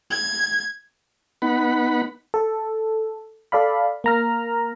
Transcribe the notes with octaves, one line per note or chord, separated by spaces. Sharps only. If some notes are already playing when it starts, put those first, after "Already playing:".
G#6
B3 D#4 F#5 B5
A4
A4 D5 F5 B5
A#3 A#5 F6